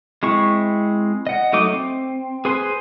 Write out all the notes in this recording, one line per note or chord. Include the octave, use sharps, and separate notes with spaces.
G#3 C4 E4 C#6
D#5 F#5
F#3 A3 D#4 D#5 D6
C4
G#4 B4 C5 G#5 C6